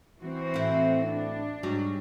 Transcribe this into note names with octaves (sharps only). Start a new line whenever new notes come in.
E3 C4 F#4
A2 E4
D4
G#2 F#3 G3